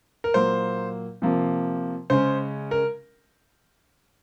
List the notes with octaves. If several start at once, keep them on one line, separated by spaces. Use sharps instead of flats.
A#4
A#2 F#3 A#3 C5
C3 F3 A#3
C#3 G#3 C#4 C5
A#4